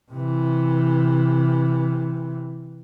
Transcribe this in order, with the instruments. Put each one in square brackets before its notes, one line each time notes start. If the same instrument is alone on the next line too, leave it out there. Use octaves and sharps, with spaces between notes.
[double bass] C3 E3